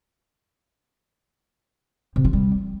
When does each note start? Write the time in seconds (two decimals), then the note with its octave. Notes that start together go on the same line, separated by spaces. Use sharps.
2.16 C3
2.24 F3
2.33 G3